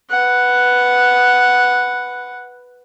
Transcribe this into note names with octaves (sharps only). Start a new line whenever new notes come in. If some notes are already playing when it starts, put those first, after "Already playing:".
B4 F#5